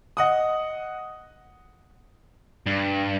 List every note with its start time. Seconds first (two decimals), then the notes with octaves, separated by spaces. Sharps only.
0.17 D#5 F#5 D#6
2.66 G2